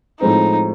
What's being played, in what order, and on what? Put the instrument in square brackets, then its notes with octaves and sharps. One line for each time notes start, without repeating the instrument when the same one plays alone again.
[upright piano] A2 F3 G#3 C4 [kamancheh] D#4